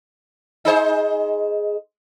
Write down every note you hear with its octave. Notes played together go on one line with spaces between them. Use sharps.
D#4 G#4 C5